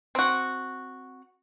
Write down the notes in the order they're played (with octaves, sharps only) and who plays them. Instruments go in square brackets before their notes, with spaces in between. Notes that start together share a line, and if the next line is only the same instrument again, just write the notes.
[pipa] C4 F#4